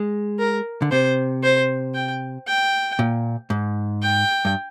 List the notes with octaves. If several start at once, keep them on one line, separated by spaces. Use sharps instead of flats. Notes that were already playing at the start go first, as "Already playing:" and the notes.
Already playing: G#3
A#4
D3
C3 C5
C5
G5
G5
A#2
G#2
G5
G2